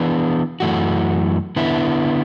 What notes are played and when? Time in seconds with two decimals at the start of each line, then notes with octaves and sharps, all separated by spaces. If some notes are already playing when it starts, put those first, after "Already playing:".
Already playing: E3 B3 D4
0.60 F#2 E3 A3 F#4
1.56 D3 B3 E4